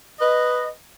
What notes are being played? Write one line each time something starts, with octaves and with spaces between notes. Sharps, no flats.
B4 D#5